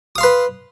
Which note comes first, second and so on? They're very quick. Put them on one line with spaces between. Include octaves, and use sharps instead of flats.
D#6 F5 C6 B4